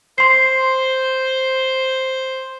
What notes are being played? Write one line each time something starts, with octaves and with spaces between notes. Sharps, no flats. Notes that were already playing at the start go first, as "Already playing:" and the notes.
C5 C6 C7